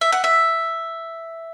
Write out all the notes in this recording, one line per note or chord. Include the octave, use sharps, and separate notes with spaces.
E5
F#5
E5